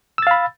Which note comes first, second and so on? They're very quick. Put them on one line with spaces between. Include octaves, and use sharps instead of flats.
E6 A6 F5 B5